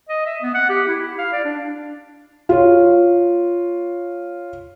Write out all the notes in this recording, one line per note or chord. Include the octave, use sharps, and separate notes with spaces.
D#5
E5
B3
F#5
G4
E4
E4
F5
D5
D4
F4 C#5